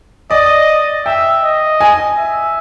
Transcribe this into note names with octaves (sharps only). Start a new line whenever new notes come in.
D5 D#5
E5 G5
D#5
G#5
E5